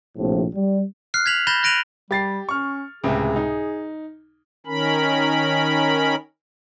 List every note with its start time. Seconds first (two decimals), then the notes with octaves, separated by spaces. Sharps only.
0.17 A#1 A2 C3 F3
0.54 G3
1.14 F6 F#6 C7
1.26 G#6 B6 F7 F#7
1.47 B5 G6 A6 A#6 E7 G7
1.63 F#6 A#6 D7 D#7 F7 F#7
2.11 G3 G4 A6 C7
2.49 C#4 C#6 F6
3.04 C#2 A2 C3 G#4
3.36 D#4
4.66 D#3 C#4 A#4 B5